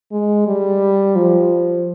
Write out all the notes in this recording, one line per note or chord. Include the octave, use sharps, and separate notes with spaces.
G#3
G3
F3